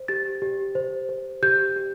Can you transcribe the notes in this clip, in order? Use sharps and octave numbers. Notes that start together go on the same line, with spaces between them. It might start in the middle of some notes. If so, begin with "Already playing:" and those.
Already playing: C5
G4 A6
G4
C5
C5
G4 G6
G4